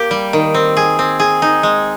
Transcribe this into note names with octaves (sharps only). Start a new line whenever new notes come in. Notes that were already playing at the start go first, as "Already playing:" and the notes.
Already playing: A#3 G4
G3
D#3
C4
G#4
C4
G#4
D#4
G#3